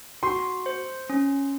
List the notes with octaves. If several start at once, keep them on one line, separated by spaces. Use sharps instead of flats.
F#4 C6
C5
C#4